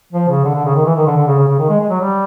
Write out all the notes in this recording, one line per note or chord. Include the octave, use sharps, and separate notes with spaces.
F3
C#3
D3
D3
C#3
D#3
E3
D#3
D3
D3
C#3
C#3
C#3
D#3
G#3
G#3
F#3
G3